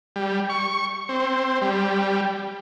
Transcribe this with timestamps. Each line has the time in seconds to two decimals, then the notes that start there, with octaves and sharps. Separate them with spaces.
0.16 G3
0.50 C#6
1.09 C4
1.61 G3